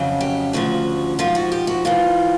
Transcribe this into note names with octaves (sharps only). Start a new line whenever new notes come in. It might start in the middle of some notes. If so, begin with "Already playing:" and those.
Already playing: F2 C#3 F#3
G4
D2 C#3 F3 F#4
G#2 F3 F4
F#4
G4
F#4
G#2 E3 F4